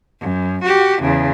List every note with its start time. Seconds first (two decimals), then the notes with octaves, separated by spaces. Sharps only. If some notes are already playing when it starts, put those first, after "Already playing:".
0.21 F#2
0.64 F#4 G4
1.01 E2 C#3